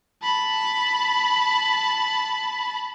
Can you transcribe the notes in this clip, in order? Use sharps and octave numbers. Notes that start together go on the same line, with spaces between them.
A5 B5